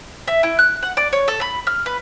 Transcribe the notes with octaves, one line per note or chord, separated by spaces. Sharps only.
E5
E4
F#6
F#5
D5
C#5
A4
B5
F6
B4